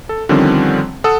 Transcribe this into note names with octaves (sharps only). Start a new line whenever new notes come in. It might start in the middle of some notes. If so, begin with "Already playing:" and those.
A4
D3 D#3 F3 G3 C4 C#4
A4 F#5 D#6 E6